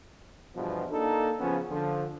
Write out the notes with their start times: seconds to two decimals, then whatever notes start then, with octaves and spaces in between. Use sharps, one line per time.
0.55 E2 G2 B2 F3
0.91 A#3 D4 D#4 A4
1.39 C#3 F3 B3 C#4
1.70 D3 F3